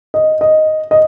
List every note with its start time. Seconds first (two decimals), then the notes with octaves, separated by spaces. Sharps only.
0.14 D#5
0.41 D#5
0.91 D#5